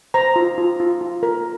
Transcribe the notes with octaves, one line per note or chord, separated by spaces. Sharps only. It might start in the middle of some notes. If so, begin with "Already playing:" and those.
C5 A#5
F4
F4
F4
F4
A#4